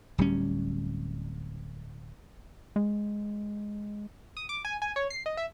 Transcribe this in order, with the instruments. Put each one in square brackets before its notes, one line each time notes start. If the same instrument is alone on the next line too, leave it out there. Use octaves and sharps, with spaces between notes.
[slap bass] D1 G3 C#4
[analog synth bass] G#3
[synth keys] D#6
D6
G#5
G#5
C#5
C7
D#5
E5